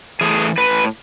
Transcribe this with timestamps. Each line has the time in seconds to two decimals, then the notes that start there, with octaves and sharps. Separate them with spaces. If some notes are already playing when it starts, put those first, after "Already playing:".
0.21 E3 A3 G#4
0.58 A2 B4